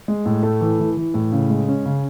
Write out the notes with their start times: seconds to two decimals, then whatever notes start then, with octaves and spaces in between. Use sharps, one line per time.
0.08 G#3
0.26 A2
0.43 A3
0.61 E3
0.80 E3
0.97 E3
1.14 A2
1.32 C#3
1.50 G#3
1.68 C#4
1.86 C#3